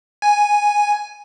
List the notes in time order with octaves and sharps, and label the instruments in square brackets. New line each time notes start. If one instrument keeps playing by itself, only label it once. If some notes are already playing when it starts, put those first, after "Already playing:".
[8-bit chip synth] G#5